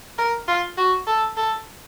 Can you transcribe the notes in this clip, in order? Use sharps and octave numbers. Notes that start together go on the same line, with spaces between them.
A#4
F4
F#4
A4
A4